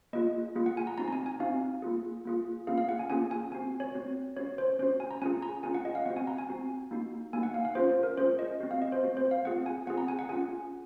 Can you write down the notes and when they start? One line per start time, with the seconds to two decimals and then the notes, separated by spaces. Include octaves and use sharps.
0.13 A#3 F4 G#4 D#5
0.55 A#3 F4 G#4
0.66 F#5
0.77 G#5
0.87 A#5
0.98 C4 D#4 F#4 A#5
1.08 A#5
1.13 G#5
1.26 G#5
1.40 C4 D#4 F#4 F5
1.82 A#3 F4 G#4
2.25 A#3 F4 G#4
2.67 A#3 C#4 F4 G#4 F5
2.78 F5
2.89 F#5
2.99 G#5
3.10 A#3 C#4 F4 G#4 G#5
3.31 G#5
3.52 C4 F#4 G#5
3.80 C#5
3.95 C4 F#4
4.37 C#4 F#4 C#5
4.58 C5
4.79 C#4 F#4 C5
5.00 G#5
5.11 A#5
5.22 C#4 F4 G#4 G#5
5.42 A#5
5.63 C#4 F4 G#4 G#5
5.75 F#5
5.85 D#5
5.95 F5
6.06 C4 F#4 F#5
6.17 G#5
6.27 A#5
6.38 G#5
6.49 C4 F#4
6.91 A#3 D#4 F#4
7.33 A#3 D#4 F#4 G#5
7.43 F#5
7.54 F5
7.65 F5
7.75 C#4 F4 G#4 C5
7.89 C5
8.03 A#4
8.17 C#4 F4 G#4 C5
8.39 D#5
8.60 C4 F#4
8.71 F5
8.82 D#5
8.92 C5
9.03 C4 F#4
9.17 C5
9.31 F5
9.45 C4 F4 G#4 F#5
9.66 G#5
9.87 C4 F4 G#4 F#5
9.98 A#5
10.08 G#5
10.19 F#5
10.29 C#4 F4 G#4 G#5